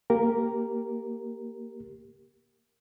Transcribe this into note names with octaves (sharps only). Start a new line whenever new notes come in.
A#3 G4 A#4